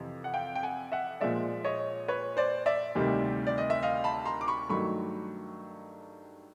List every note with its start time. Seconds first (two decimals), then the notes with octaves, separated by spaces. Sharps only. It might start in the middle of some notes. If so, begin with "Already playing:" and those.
Already playing: F2 C3 E3
0.24 F#5
0.33 F5 G5
0.55 G5
0.63 F#5 G#5
0.92 E5 F#5
1.21 A#2 F3 G#3 D5 E5
1.64 C#5 D#5
2.08 B4 C#5
2.37 C5 D5
2.66 D5 E5
2.95 D2 C3 D#3 G3
3.47 D5
3.58 D#5
3.70 E5
3.83 D#5 F5
4.04 A5 B5
4.25 A#5 C6
4.41 D6
4.48 B5 C#6
4.69 G2 D#3 F#3 A3 B5 C#6